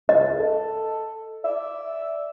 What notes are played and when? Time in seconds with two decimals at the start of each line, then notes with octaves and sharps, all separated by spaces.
0.09 C#2 D#5
0.39 A4
1.44 D5 E5